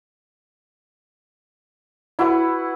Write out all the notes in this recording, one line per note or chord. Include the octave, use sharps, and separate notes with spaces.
E4 F#4 B4